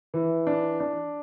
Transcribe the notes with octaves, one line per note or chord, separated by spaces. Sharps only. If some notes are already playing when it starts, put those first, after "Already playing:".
E3
D4
D4